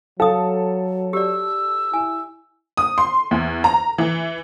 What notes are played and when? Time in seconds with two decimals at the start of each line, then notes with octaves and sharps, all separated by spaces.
0.20 F#3 A4 F5 D#6
1.13 G4 D5 E6
1.93 E4 G#5
2.77 D#6
2.98 C6
3.31 E2
3.64 A#5
3.98 E3